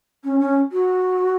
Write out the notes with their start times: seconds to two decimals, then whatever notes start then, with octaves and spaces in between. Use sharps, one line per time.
0.24 C#4
0.40 C#4
0.72 F#4